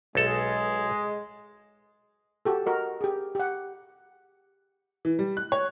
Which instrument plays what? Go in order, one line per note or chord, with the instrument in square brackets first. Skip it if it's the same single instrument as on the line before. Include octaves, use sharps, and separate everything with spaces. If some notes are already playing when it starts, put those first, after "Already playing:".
[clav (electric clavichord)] B1 A4 [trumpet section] G#3
[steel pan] F#4 G4 A4
F#4 A#4 D#5
G4 G#4
G4 F#5
[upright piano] E3
G3
F#6
C#5